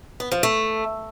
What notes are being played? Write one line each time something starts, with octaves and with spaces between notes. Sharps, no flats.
B3
F3
A3